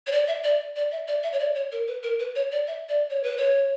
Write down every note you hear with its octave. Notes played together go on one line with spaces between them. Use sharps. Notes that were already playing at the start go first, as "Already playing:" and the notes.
C#5
D5
E5
D5
D5
E5
D5
E5
C#5
D5
C#5
A#4
B4
A#4
B4
C#5
D5
E5
D5
C#5
B4
C#5